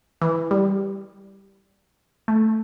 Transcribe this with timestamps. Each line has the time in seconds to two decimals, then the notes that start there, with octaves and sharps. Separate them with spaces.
0.22 E3
0.51 G3
2.28 A3